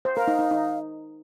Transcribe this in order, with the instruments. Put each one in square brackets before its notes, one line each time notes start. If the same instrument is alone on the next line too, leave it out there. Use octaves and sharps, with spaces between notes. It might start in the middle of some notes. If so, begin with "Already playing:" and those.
[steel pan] C5
[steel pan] A#4 [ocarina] F5
[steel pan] D#4
D#4
D#4